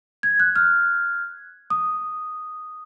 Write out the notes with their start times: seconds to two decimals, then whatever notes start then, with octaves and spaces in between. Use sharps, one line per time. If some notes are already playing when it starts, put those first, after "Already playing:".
0.23 G#6
0.40 F#6
0.56 F6
1.70 D#6